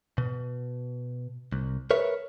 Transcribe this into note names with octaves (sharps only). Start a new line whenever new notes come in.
B2
C2
A#4 B4 C#5 E5